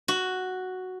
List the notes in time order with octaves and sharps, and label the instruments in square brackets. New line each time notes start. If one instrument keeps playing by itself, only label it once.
[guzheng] F#4